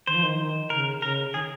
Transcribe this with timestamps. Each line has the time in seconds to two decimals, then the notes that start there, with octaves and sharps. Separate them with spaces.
0.07 D#3 C5
0.15 F3
0.23 D#3
0.38 D#3
0.70 C#3 A#4
1.02 C#3 A#4
1.34 D#3 G#4